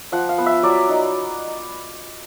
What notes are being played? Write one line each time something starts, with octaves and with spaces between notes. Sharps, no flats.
F3 F#5
F5
B3
E5
F#3 D5
D#4